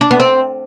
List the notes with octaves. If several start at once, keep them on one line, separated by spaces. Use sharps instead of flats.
D4
B3
C4